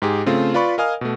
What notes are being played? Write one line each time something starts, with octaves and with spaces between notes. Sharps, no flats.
G#2 G4 G#4
C#3 A3 C4 F4
F4 B4 D5 B5 C#6
A#4 D#5 F5 G#5 D#6 F6
B2 A3